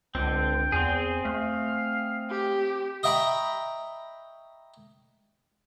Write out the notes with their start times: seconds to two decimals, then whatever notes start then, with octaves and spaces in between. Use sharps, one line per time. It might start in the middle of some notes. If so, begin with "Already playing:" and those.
0.15 C#2 D3 C4 G5
0.72 E2 C4 G#4
1.25 A3 F5
2.30 G4
3.03 D#5 E5 G5 A#5 B5 C#6